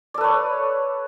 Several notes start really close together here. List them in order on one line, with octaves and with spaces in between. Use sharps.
D5 A4 B4 C#5